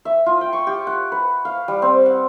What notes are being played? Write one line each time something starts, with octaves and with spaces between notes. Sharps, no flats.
E5
F4
G5
C#6
G4
F#5
B4
F5
G3
C4
F#5